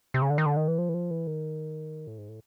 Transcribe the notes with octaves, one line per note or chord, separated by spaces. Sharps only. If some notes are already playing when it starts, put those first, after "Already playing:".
C3
C#3
D3
D#3
D3
D#3
E3
F3
E3
F3
E3
D#3
A2
G#2
A2